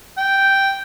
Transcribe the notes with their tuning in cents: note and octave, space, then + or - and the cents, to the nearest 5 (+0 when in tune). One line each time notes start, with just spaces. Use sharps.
G5 -5